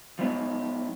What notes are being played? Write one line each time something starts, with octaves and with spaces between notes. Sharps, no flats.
F3 B3 D#4